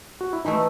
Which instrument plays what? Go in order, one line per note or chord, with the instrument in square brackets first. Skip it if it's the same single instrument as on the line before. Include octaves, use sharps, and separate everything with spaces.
[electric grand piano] F#4
E4
[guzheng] E3 A3 [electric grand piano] D#4